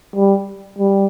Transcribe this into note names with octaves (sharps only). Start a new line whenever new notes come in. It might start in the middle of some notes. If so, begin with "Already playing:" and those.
G3
G3